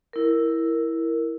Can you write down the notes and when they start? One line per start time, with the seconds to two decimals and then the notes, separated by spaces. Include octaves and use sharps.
0.13 E4 A#4